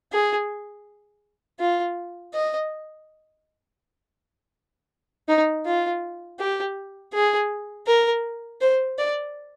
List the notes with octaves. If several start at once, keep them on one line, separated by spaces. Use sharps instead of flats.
G#4
F4
D#5
D#4
F4
G4
G#4
A#4
C5
D5